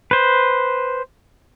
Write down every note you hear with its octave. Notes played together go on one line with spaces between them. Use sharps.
B4 C5